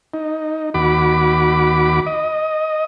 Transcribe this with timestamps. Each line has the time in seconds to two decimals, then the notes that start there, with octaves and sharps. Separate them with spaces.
0.14 D#4
0.74 D#2 F#4 B5 D6
2.06 D#5